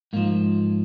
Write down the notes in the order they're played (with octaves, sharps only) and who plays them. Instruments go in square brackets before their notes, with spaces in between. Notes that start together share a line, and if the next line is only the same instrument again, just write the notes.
[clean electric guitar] G#2 F3 A#3